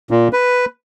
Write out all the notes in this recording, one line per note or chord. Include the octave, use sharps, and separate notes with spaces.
A#2
B4